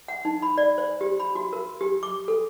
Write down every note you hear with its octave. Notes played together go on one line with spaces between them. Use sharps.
F#5
D#4
B5
D5
C5
G4
B5
F#4
A#4
G4
D6
A4